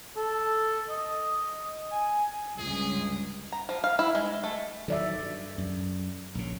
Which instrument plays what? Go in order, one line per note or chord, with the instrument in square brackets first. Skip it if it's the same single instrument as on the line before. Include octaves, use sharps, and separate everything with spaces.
[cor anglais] A4
D#5
G#5
[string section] C#2 G2 [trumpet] G#4
[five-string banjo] A#5
F3
F5
E4
G#3
A3
[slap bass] D#3 F#3 [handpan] A4 D5 E5
[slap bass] G2
F#2
A#1 C#3